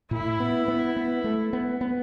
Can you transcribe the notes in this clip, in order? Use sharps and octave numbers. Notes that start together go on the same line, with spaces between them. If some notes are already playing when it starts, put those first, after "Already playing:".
A2 E4
B3
B3
B3
A3
B3
B3